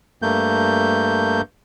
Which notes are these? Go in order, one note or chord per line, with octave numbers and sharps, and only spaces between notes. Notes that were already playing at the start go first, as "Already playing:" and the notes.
G2 A3 A#3 G6